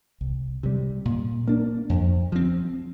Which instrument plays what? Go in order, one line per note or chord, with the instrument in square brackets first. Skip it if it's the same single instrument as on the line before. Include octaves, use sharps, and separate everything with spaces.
[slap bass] C2
C3 G3
A#2
A#3 D4
F2
F3 C4